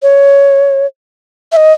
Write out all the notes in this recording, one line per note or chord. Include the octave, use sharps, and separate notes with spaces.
C#5
E5
D#5